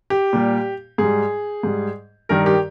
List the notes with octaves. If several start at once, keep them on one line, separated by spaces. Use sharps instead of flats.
G4
A#2 G3
G#2 G3 G#4
G#2 G3
G2 D#3 G3 A#4
G4